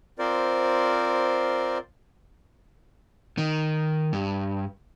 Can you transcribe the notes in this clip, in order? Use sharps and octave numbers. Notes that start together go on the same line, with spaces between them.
C4 F4 A#4 C5 D5
D#3
G2